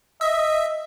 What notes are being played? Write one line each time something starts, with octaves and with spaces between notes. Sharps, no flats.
D#5 E5